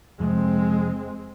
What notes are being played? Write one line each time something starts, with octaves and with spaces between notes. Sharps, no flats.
F2 C3 F3 G#3 C4